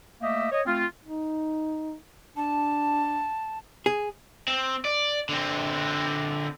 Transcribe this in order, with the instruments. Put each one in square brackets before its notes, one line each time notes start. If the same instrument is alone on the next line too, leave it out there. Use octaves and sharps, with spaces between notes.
[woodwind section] A3 A#3 G4 D#5 E5
C#5 D#5
A3 C4 F4
[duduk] D#4
[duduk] D4 [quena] A5
[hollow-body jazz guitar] G#4
[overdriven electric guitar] C4
D5
D3 C4